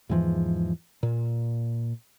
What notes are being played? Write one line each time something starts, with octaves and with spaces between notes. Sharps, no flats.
E2 G#2 E3 F3
A#2